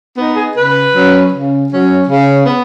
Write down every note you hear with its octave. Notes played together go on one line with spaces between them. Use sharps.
B3 D#4
G#4
C#3 B4
F#3 C#4
C#3
F#3 C#4
C#3
B3